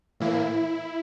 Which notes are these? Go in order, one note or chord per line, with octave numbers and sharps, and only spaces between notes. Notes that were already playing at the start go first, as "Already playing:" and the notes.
A2 E3 A#3 E4